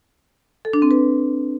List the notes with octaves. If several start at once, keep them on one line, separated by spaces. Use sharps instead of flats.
A4
D4
C4
B4